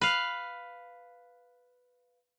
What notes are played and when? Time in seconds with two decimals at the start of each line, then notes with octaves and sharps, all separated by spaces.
0.01 B4 F5